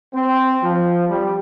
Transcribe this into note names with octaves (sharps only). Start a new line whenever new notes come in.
C4
F3
G3